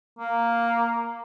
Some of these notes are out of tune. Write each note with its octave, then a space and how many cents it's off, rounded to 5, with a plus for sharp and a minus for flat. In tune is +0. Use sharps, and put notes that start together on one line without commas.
A#3 +0